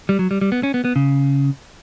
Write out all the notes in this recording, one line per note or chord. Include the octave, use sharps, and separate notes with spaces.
G3
F#3
G3
G3
B3
C#4
B3
B3
C#3